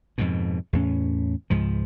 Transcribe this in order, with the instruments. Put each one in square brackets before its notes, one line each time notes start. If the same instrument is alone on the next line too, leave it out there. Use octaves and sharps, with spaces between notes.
[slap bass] F2 G#2 B2
E2 A2 C#4
C#2 G#2 F3